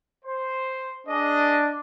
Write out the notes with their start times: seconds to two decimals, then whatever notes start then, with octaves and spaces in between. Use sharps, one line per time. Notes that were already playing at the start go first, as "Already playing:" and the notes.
0.25 C5
1.07 D4 G#4 D#5